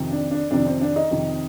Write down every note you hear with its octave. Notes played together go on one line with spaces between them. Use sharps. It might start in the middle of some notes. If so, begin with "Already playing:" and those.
Already playing: F2 C3 D#3
D4
D4
F2 C3 D#3 D4
C4
D4
D#4
F2 C3 D#3